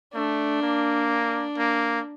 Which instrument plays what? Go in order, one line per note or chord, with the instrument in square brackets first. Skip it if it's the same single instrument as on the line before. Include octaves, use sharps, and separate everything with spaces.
[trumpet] A3 [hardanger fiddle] D4
[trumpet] A#3
[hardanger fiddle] D4
[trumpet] A#3